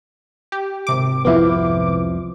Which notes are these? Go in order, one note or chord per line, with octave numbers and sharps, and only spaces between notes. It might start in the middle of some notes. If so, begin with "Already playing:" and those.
G4
G#1 C3 D6
C2 F2 F3 B3 E4